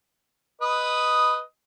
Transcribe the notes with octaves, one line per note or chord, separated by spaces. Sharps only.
B4 D#5 D#6